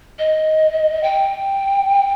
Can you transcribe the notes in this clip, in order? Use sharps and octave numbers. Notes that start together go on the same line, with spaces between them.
D#5
G5